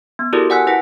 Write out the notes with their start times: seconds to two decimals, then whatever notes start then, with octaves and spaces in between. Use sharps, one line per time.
0.19 B3
0.33 E4 F#4 G4 A4 A#4 D5
0.50 D5 F#5 G#5 E6 F#6
0.67 E4 B4 F#5